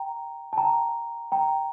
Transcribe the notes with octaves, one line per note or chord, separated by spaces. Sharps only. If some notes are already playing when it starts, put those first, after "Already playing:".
Already playing: G5 A#5
A5
G5 A#5
G5 A#5